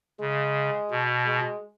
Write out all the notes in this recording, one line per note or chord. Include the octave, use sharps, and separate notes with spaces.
C#3 G#3
B2
G#3